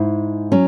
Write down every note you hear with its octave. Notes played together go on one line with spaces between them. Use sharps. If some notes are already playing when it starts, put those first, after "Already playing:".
Already playing: G#2 E4
F#3 C#4